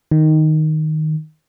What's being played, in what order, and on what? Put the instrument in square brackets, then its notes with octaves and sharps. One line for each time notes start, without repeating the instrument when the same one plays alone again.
[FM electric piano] D#3